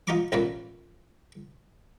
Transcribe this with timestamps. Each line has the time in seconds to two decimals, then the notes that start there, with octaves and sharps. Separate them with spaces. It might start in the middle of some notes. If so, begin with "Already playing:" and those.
0.07 D#4 F4 D#5 A#5 C#6 D6
0.32 A1 F4 A#4 B4 C#5 D5